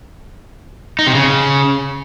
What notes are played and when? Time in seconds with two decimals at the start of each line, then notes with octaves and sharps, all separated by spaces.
0.99 D#4
1.07 C3
1.15 C#3